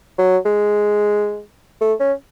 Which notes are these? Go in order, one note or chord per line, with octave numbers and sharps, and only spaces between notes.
F#3
G#3
A3
C#4